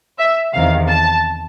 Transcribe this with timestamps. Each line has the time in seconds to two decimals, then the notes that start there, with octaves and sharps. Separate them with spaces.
0.18 E5
0.54 E2 C3 D#3 F5
0.88 A5